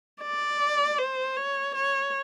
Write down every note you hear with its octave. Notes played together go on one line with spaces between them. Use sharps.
D5
C5
C#5
C#5